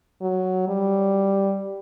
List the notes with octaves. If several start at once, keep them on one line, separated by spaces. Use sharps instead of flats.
F#3
G3